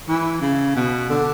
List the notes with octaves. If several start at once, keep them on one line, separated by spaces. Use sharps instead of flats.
E3
C#3
B2
D3